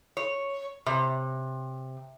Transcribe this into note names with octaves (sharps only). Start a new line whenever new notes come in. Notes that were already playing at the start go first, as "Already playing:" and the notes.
C#5
C3